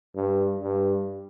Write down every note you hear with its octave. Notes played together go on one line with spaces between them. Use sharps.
G2
G2